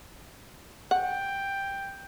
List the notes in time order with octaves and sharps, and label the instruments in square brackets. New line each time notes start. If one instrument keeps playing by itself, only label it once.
[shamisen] F#5 [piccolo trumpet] G5